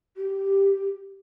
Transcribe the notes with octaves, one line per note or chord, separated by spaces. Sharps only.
G4